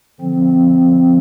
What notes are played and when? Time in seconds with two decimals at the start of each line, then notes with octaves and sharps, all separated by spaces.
0.20 D3 F3 C4